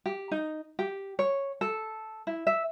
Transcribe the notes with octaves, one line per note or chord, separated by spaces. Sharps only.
G4
D#4
G4
C#5
A4
E4
E5